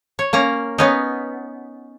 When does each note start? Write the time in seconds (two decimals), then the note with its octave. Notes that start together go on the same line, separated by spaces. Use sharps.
0.19 C#5
0.33 A#3 C#4 A#5
0.78 B3 C#4 D#4